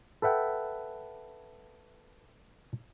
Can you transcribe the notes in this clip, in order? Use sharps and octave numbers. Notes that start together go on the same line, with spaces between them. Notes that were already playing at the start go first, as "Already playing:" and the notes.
A4 B4 E5 F#5 G5